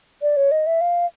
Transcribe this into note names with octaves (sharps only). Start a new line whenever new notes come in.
D5
C#5
D#5
E5
F5